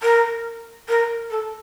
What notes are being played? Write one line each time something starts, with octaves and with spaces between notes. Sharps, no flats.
A#4
A#4
A4